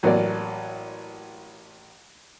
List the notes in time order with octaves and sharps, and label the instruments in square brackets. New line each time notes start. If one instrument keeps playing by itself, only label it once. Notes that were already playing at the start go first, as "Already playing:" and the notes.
[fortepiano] A1 F#3 A#3 D5